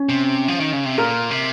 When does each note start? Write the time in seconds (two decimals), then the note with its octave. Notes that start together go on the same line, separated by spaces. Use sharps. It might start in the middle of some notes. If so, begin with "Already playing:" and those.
Already playing: C#4
0.09 C3
0.48 F3
0.60 D#3
0.73 C#3
0.85 C3
0.98 A#2 A#4
1.31 C3